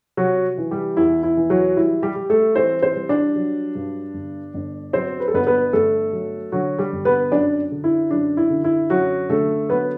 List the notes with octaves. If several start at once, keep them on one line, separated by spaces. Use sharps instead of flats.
C3 F#3 F#4
E3
G3 G4
E2 E4
E4
E3
F#3 F#4
G3 E4
G3 G4
G3
A3 A4
E3 C4 C5
C4 C5
G3
D4 D5
F#3
G2
G1
G1
F#3 C4 C5
B4
A4
G1 B3 B4
B3 B4
G1 A3 A4
F#3
D3 F#3 F#4
G3 G4
G1
B3 B4
F#2 D4 D5
D3
E4
F#2 D4
E4
D3
E4
F#2 F#3 F#4
D3 A3 A4
F#3 B3 B4